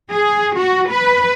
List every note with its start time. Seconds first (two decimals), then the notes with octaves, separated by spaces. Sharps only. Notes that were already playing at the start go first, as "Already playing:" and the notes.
0.11 G#4
0.57 F#4
0.92 B4